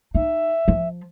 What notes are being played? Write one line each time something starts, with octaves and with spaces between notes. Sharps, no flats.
D#4 E5
F3